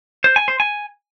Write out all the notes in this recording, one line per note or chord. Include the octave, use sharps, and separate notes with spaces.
C5
G#5
C5
G#5